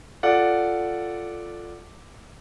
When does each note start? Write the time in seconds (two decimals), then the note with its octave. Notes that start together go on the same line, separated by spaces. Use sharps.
0.23 F4 A4 D5 F#5